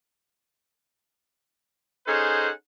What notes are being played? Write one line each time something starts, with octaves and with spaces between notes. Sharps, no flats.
C#4 D#4 G#4 A4 C5 F#5